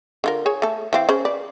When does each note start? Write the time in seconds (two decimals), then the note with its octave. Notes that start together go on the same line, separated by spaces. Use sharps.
0.24 D3 F4 A#4
0.46 G#4 C#5 G#5
0.62 A3 A4
0.93 E3 C4 F5
1.09 C#4 G#4 C5
1.25 B4 D5